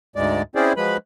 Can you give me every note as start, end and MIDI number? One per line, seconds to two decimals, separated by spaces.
0.16 0.42 38
0.16 0.42 44
0.16 0.42 56
0.16 0.42 74
0.55 0.73 60
0.55 0.73 61
0.55 0.73 64
0.55 0.73 68
0.55 0.73 72
0.55 0.73 74
0.77 0.97 53
0.77 0.97 54
0.77 0.97 56
0.77 0.97 71
0.77 0.97 83